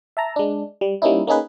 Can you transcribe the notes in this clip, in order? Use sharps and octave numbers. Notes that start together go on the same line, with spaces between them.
E5 A5 A#5
G#3 D4
G3
G3 A#3 C#4 D#4 E4
A#3 C#4 D#4 G#4 B4